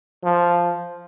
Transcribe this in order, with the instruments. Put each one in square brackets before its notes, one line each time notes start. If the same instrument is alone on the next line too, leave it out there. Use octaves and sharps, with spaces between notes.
[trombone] F3